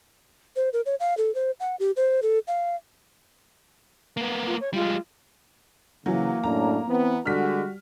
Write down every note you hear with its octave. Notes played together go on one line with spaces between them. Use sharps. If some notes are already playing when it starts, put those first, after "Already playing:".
C5
A#4
C#5
F5
A4
C5
F#5
G4
C5
A4
F5
A#3 B3
F4
C#5
G3 G#3 F4
C#3 E3 F#3 A#3
F#2 A2 D4 A#5
E3 B3 C4
D3 G3 G#3 F#4 F6 B6